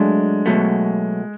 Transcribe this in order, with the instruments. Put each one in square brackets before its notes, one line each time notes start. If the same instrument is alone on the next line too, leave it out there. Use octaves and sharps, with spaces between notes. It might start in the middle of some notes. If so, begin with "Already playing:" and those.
Already playing: [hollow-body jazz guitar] F#3 A3 D4 [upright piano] G#3
[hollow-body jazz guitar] B2 F#3 A3